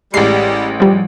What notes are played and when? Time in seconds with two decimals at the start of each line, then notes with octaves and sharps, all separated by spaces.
0.14 A1 G3 G#3 C7
0.80 F3 G3